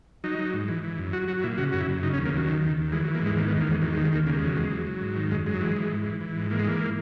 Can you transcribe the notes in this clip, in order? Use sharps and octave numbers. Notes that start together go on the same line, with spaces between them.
F#3 D#4
F#3
G#2
E3
E3
F#2
F#3 F#4
F#3 F#4
A#2 E4
C#3 F#4
F#2 F#4
E4
F#2
C#3 D#4
C#4
D#2
A#3
D#2 F#3
D#3
D#2
D#2
E3 G#3
F#3
E3
A#3
G#2 G#3
D#3 A#3
B3
E2
A#3
E2 G#3
D#3 F#3
G#3
D#2
G#3
D#2 A#3
C#3 A#3
G#3
E2
F#3
E2 G#3
F#3
F#3
G#2
D#3
F#2 G#3
F#2 G#3
F#3
E3 G#3
E3
G#2
E3
E3
G#2
E3 A#3
G#3
E3 A#3